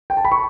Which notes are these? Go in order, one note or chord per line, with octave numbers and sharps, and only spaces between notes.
G5
A5
B5
C#6